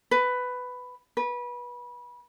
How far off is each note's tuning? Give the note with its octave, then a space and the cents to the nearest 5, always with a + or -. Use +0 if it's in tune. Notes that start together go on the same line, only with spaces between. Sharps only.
B4 +10
B4 -25